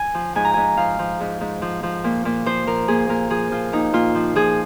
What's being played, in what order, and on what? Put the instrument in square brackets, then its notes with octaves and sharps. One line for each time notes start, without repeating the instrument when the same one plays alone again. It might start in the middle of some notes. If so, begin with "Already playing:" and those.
Already playing: [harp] G#5
F3
G#2 G#5
A#5
G#2 G#5
F3 F5
F3
G#2
G#2
F3
F3
A#2
A#2
F3 C5
F3 A#4
A#2 G#4
A#2 A#4
F3 G#4
F3 F4
A#2 D#4
A#2 F4
F3
F3 G#4